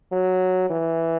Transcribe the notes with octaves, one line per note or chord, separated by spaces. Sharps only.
F#3
E3